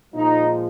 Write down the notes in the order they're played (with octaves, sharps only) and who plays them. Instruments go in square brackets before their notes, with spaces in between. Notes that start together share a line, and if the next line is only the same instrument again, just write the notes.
[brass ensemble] A#2 F3 G#3 D#4